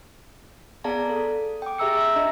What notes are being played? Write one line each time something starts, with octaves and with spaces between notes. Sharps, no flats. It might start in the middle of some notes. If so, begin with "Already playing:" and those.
B3 G#4 D5 F5 A5 A#5
A4
G5 D6
G4 G#4 E5 A#5 E6 C#7
E5
D4 D#5 A#5